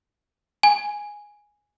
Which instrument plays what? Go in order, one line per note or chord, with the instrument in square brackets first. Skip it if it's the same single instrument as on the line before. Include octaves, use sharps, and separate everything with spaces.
[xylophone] G#5